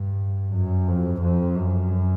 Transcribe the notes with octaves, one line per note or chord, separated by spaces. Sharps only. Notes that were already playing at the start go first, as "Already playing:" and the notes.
Already playing: G2
F#2
F2
F2
F#2